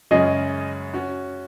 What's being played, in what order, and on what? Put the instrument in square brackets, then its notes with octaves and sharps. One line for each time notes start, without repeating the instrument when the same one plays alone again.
[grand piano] F#2 C#3 G#3 C#4 G#4 [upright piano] D#5
[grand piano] C#4 F#4